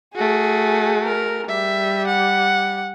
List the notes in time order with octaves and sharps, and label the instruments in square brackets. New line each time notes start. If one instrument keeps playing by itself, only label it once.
[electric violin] A3 F#4 [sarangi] G#4
[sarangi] A#4
[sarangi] G3 [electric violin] E5
[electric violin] F#5